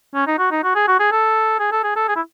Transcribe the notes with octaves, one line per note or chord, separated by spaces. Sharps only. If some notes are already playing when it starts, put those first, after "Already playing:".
C#4
D#4
F#4
D#4
F#4
G#4
F#4
G#4
A4
G#4
A4
G#4
A4
G#4
E4